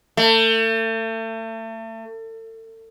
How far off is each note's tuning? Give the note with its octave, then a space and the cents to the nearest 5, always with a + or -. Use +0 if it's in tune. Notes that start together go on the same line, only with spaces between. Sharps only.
A3 +35